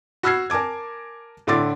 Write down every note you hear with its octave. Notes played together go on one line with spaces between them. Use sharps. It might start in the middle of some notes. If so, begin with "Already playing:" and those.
F#4 B5 E6 F6 G#6 C7
A#4 G#5 A5 D6 G#6
A2 D3 E4 C6 D6 A6